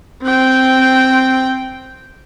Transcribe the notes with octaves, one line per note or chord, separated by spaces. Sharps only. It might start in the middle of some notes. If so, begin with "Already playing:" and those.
C4 G5